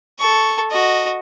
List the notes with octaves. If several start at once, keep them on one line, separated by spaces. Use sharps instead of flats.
A4 C#6
F#4 D#5